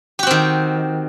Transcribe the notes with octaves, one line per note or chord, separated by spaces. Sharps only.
D#3 C4 F#4 G4